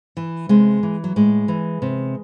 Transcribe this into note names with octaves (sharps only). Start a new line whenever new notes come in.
E3
C3 G#3
E3
F#3
A2 G#3
E3
C3